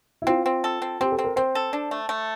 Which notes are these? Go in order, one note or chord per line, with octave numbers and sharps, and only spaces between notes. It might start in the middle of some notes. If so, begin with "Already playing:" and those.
E4
C4 F4
C4
A4
C4
C4 G4
A4
C4
A#4
C4 C5
A4
D4
A3
A3